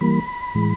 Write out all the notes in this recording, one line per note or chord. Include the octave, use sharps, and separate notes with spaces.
E3 G3 A#3 B5
A2 E3 G#3